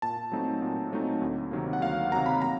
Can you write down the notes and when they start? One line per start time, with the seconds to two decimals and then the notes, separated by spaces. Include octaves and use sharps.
0.02 A#2 A5
0.32 F#3 A3 C4 D#4
0.62 A#2
0.92 F#3 A3 C4 D#4
1.22 D2
1.51 C3 D#3 F#3 A#3
1.73 F#5
1.81 D2 F5
2.11 C3 D#3 F#3 A#3 A#5
2.26 B5
2.42 A#5